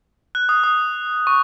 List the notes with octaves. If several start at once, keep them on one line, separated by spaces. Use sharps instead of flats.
F#6
D#6
D#6
C#6